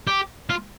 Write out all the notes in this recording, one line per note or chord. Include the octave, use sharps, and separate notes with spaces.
G4
F4